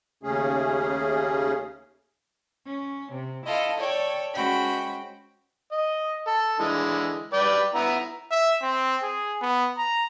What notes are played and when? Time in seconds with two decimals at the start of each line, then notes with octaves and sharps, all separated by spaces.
0.23 D#2 C#3 A3 C#4 G#4
2.66 C#4
3.11 C3
3.46 E4 F4 A4 D#5
3.77 A4 C#5 D5 G5
4.33 G#3 C#4 F#4 C5 G5 B5
5.72 D#5
6.27 A4
6.60 D3 E3 G#3
7.33 B4 D5 G5
7.75 B3 E4 A#5
8.31 E5
8.62 C4
9.03 G#4
9.42 B3
9.78 A#5